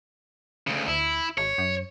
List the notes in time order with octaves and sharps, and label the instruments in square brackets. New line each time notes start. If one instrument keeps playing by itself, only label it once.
[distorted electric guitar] D2 C#3
[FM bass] D2 [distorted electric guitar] E4
[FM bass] G#1 [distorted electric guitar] C#5
[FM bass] F#2